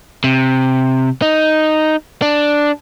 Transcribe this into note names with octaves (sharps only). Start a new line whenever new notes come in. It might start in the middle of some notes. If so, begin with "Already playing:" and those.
C3
D#4
D4